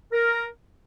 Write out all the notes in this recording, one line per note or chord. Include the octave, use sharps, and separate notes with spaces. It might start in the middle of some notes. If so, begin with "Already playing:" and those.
A#4